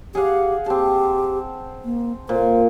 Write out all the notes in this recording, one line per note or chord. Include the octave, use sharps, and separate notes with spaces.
G4 G#4 F5 F#5
C4 G4 A5
A#3
A#2 C5